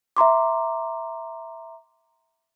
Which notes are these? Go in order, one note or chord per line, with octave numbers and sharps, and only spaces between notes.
E5 A#5 C6 D6